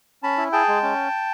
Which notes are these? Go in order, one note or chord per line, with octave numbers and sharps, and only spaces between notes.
C#4 A5 B5
E4
G#4 G5 A5
G#3
C#4